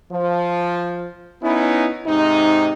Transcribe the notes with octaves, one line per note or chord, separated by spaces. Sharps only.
F3
B3 C#4 D#4 E4
G#2 C3 D#4